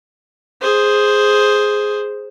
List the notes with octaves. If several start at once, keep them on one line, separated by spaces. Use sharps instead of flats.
G#4 C5